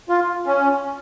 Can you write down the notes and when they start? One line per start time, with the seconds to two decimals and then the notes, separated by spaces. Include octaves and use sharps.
0.09 F4
0.46 C#4